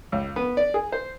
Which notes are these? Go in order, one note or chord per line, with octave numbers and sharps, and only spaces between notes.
C#2
B3
D5
G#4
C5